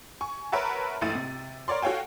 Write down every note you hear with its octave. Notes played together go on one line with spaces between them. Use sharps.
G#5 C#6
A#4 B4 C#5 E5 F#5 A5
A#1 G#2 A3 E4 A6 D#7
C3
A#4 C#5 D5 C6
F#4 A4 C#5 F5 G5 G#5